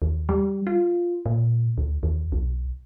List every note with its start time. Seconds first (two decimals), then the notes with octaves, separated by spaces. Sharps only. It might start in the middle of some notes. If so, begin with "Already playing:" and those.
0.02 D#2
0.29 G3
0.67 F4
1.26 A#2
1.78 D2
2.03 D#2
2.32 B1